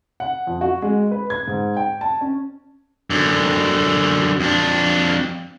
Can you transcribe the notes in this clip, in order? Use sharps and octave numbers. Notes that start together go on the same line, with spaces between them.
F#5
F2
F#4
G#3
B4
G#6
G#2
G5
A5
C#4
F#2 D3
F2 D4